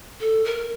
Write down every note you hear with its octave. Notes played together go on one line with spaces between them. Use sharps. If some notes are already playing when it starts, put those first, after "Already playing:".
A4
A#4